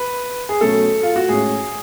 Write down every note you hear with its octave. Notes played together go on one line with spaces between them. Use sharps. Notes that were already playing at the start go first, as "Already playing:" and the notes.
Already playing: B4
G#4
B2 F#3 A3 C#4 A4
F4
F#4
A2 G#3 C#4 G#4